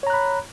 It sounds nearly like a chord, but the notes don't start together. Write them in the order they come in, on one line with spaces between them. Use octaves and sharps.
C#5 A#5 F#6 B5